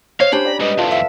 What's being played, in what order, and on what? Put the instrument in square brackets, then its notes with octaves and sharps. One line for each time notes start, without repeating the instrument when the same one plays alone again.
[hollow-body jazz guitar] C5 C#5 D#5 [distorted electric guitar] F5
[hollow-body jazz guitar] C#4 D4 G4 [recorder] C5 [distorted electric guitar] B5
[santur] D5 G5 A#5
[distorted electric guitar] G#2 G3 [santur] B4 [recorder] D#5
[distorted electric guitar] C2 F2 [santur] F4 A4 E5
[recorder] E5 [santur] F5 D6